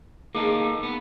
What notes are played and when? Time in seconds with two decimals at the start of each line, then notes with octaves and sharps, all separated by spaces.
0.35 A#3 D#4 G#4 A4
0.83 B3